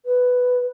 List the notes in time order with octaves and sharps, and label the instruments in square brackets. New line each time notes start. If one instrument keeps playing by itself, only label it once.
[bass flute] B4